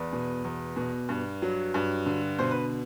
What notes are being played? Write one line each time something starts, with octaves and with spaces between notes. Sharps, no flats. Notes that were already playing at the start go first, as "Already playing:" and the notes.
Already playing: E2 B4 D5
B2
E2
B2
G2
F#3
G2
D3
B2 C5
B4